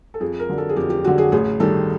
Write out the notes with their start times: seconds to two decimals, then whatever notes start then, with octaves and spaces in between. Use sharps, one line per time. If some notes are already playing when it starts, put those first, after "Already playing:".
0.14 A4
0.20 F2 G#4
0.40 A#4
0.49 D3 F#3
0.58 A4
0.69 G#4
0.76 F2 G4
0.90 G4
1.04 D3 F#3 F#4
1.18 G#4
1.32 A1 G#4
1.60 G2 D#3 G3 A4